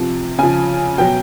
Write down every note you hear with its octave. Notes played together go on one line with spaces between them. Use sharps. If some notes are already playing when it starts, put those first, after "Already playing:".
Already playing: C3 F3
C#3 F3 G#5
B2 F#3 G5